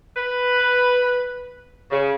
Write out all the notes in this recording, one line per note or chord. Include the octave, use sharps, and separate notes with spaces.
B4
C#3